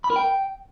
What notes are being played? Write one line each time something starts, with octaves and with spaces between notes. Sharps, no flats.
B5
A#4
G5